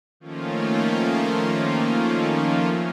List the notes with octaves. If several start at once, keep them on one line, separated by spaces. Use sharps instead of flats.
D#3 F3 A3 A#3 C#4 F4